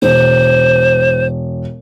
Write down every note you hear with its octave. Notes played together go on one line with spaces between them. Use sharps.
E1 C5